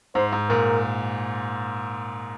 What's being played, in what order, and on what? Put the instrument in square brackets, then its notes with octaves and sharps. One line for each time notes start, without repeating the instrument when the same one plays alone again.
[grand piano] G#2 [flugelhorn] C5
[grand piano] G#2
[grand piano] A#2 [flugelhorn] A#4